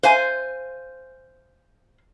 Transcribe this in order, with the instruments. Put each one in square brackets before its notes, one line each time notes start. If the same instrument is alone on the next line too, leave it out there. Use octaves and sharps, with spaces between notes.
[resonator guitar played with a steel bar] C5 F5 G#5